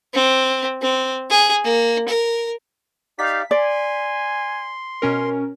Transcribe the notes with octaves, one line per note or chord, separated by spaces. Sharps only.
C4
C4
G#4
A#3
A#4
D#4 G4 D5 F5 B6
D5 G#5 C6
B2 C#4 A#4